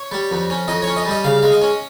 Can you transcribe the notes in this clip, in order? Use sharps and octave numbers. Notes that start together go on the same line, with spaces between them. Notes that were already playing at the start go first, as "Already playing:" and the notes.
Already playing: C#5
G3
F2
C#4
F2 D#5
C#5
C#4
D#5
G3
D#5
C#3 F5
G#3 F5
D#5
C#4